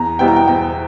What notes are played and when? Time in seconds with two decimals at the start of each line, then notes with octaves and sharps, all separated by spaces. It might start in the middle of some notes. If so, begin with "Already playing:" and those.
Already playing: E2 A#5
0.19 B2 G3 B3 E4 G5
0.28 A#5
0.36 G5
0.47 E2 G5